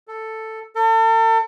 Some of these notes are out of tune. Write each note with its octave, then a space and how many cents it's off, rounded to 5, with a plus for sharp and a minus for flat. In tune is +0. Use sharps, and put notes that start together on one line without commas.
A4 +5
A4 +40